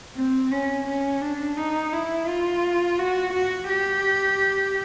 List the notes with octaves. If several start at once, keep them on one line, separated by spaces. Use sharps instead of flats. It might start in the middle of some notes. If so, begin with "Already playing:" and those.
C4
C#4
C#4
D4
D#4
E4
F4
F#4
F#4
G4